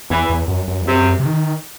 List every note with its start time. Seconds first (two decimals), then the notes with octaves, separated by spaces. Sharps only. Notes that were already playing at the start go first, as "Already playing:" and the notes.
0.10 E2 E3
0.30 E2
0.48 F#2
0.68 F#2
0.81 E2
0.87 F#2 C3
1.19 C3
1.25 D#3